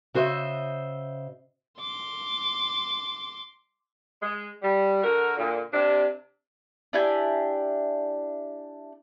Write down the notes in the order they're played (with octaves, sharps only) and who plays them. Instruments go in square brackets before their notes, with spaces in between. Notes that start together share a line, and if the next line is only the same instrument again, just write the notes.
[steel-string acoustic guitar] C#3 F#4 C5 D#5 E5
[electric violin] C6 D6
[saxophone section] G#3
G3
D3 F#4 A#4
A#2 D3
C3 D4
[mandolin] D4 E4 G4 G#5